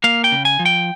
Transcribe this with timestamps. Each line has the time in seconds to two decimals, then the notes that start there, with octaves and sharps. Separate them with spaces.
0.04 A#3 F5
0.24 G5
0.32 C#3
0.45 G#5
0.59 F3
0.66 G5